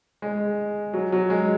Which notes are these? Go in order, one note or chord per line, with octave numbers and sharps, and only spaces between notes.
G#3
F#3
F#3
G#3